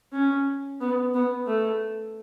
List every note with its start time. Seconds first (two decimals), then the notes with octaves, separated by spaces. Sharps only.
0.13 C#4
0.80 B3
1.14 B3
1.47 A3